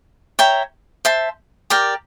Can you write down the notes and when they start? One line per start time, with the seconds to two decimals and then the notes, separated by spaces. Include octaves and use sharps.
0.39 C#5 E5 G5 A#5
1.05 C5 E5 A5
1.70 G4 A#4 D5 G5